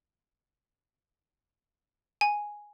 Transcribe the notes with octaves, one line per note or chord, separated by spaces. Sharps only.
G#5